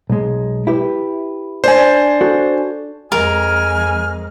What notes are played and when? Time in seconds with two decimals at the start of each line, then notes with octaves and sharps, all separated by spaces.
0.10 B1 G#3
0.67 E4 G4 B4
1.64 D4 C5 G#5
2.21 F#4 A4
3.12 F2 G#3 A#4 G#5 F6